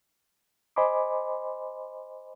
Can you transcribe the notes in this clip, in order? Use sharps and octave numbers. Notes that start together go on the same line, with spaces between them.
C5 D#5 G#5 B5 C6 D6